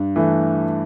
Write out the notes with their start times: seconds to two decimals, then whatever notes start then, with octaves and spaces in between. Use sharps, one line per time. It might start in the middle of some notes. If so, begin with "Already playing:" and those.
Already playing: G2
0.16 E3 A3